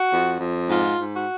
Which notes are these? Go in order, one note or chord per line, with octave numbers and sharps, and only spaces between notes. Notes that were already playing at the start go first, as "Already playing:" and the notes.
Already playing: F#4
F2
F2
G#2 F4
G#2
F#4